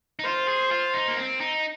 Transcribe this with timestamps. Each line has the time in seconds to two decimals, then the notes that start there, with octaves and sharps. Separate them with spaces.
0.19 D#4
0.24 F4 C5
0.48 G#4
0.71 F4
0.94 D#4
1.08 A#3
1.18 C4
1.41 D#4